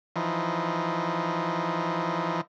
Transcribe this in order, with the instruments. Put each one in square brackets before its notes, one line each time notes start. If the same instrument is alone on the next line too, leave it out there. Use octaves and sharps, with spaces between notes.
[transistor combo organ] E3 F3 D#4